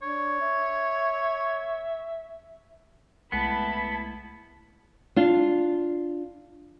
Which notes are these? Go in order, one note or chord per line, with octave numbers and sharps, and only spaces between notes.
D4 C#5
E5
C2 G#3 A3 B3 E4 A5 B5
D4 F4